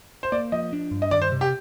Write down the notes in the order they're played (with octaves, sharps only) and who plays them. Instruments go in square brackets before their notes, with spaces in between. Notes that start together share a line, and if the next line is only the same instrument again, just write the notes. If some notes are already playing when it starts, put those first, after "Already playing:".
[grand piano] C5
[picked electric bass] A#3 [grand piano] D5
[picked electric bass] F3 [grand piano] D#5
[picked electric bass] D4
G2
[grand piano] D#5
[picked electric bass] D#3 [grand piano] D5
[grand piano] C5
[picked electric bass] C3
[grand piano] G4